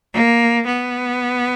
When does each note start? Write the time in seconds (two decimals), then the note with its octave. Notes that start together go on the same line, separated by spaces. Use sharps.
0.13 A#3
0.65 B3